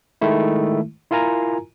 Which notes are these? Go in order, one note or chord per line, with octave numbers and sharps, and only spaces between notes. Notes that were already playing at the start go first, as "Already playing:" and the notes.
D#3 G#3 A3 E4
E4 F4 A#4 G#5 A#5